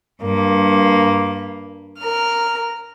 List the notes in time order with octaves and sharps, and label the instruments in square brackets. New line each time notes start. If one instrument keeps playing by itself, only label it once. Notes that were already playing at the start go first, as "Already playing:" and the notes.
[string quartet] G2 A#3
A#4 F6